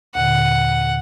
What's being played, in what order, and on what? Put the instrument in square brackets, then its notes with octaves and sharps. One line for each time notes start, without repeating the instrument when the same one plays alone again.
[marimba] D#2 A#2 D3 [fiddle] F#5